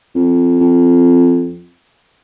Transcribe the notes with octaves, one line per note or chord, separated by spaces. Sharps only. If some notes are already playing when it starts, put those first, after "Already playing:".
F2
F2